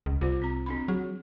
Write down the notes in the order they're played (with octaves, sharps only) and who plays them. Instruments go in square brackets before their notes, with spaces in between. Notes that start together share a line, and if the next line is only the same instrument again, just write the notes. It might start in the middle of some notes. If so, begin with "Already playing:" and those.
[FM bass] C#2
[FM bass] C2 [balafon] F4 C5
[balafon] C4 A#5
C4 D4 B5
[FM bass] F#3 [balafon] G#4